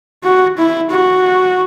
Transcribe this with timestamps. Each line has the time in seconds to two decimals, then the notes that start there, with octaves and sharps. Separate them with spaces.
0.24 F#4
0.58 E4
0.91 F#4